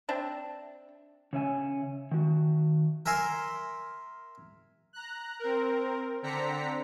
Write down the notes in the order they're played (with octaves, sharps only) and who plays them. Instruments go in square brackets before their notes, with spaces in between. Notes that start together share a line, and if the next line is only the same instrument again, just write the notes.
[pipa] C4 D4 E5
[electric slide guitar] C#3 C#5 E5 G#5
D#3 F#4
[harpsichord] A#4 E5 G#5 C6
[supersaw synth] A#5 F#6
C4 A#4
D3 C4 D4 A#5 B6 C#7